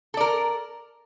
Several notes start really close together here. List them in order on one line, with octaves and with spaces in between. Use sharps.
A4 D5 A#4